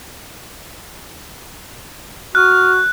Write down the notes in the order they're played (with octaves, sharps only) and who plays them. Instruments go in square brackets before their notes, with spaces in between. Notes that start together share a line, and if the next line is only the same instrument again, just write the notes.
[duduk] F#4 [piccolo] F6 [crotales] F#6